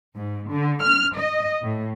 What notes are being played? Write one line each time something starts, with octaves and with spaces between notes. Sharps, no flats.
G#2
D3
F6
D#5
A2